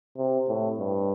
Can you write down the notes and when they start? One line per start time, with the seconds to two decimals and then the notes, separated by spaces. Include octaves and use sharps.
0.18 C3
0.49 A2
0.79 G2